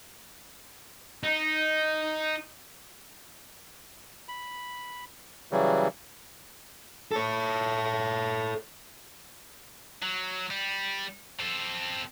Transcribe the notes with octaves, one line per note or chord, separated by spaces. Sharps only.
D#4
B5
C#3 E3 F#3 G3
A4 C#5
F#3
G3
C4 A4